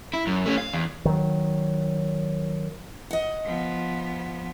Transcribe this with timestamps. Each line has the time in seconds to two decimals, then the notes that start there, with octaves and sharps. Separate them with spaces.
0.13 E4
0.27 F#2
0.46 A3 C#4
0.58 F5
0.73 E2
1.05 D#3 F#3
3.11 D#5 F#5
3.45 F3 B3